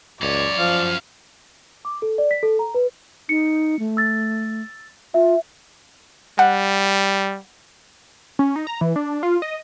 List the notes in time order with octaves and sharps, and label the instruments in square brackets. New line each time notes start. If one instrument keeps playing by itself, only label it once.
[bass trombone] C#2 [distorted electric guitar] F#2 C#5 [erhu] D5
[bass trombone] F3 [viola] F5
[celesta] D6
A4
D5
B6
A4
A#5
B4
[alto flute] D#4 [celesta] C#7
[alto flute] A3
[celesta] E6 A6
[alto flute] F4 [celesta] E5
[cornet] G3 [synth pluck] F#5
[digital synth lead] C#4
D#4
A#5
E3
D4
F4
D#5